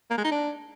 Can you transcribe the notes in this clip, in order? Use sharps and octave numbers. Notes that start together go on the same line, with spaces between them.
A#3
G#3
D#4
D4